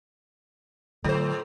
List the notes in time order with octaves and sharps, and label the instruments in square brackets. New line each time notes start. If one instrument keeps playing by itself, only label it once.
[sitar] A2 C5 [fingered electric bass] D3 F#3 A3 [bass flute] A4